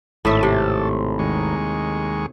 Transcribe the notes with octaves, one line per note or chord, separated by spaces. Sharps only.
G#1 A2 A3 A4 E5
C3
D#2 G#3 C#6